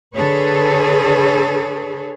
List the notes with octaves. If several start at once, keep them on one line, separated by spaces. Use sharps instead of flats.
D3 G#4 A4 B4 C#5